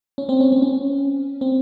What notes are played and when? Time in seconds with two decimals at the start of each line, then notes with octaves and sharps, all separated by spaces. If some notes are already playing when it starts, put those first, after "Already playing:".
0.18 C#4
0.29 C4
0.40 C#4
0.52 C4
0.62 C#4
1.41 C4